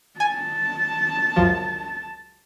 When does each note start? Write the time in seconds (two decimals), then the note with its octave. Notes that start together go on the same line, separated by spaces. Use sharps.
0.20 G#5 A5
1.36 C#2 F#2 F3